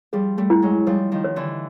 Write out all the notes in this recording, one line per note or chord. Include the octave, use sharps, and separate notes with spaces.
F3 G3 G#4
G3 A3
E4
F#3 G#3
F3 G3 C#5
D#3 F3
C#5
D3 E3